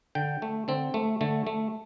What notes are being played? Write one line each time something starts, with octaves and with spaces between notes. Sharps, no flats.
D3 G5
A3
D3 C4
A3
D3 A3
A3